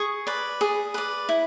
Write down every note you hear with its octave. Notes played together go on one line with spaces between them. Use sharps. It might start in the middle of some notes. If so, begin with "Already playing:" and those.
Already playing: G#4 C#6 D#6
B4 D5
G#4
B4 D5
E4